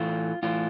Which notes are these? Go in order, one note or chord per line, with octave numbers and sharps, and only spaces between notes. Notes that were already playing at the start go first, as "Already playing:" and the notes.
Already playing: A2 E3 A3 F4
A2 E3 A3 F4